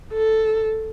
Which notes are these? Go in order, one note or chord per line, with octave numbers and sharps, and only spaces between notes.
A4